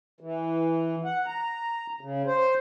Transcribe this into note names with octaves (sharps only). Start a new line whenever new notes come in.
E3
F#5
A#5
C#3
C5